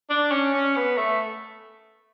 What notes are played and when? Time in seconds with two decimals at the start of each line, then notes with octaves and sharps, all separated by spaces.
0.10 D4
0.31 C#4
0.54 C#4
0.76 B3
0.98 A3